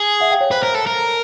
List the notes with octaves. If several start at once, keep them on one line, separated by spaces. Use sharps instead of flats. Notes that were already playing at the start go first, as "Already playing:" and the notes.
Already playing: G#4
E5 F#5
F5 G5
C#5
B4 C5
A#4
A4
A#4